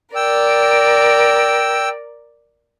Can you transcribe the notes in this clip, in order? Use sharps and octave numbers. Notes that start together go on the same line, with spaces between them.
A#4 D5 G5 E6